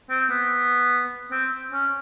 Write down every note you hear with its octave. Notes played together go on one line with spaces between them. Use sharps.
C4
B3
C4
C#4